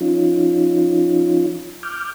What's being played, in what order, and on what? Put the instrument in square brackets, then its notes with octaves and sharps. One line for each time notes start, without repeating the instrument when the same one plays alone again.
[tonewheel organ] F3 C#4 D#4 F4
D6 F6 G6